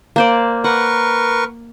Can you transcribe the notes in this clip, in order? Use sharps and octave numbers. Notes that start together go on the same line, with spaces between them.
A#3 C5 D5
A#4 B4 F#5 C#6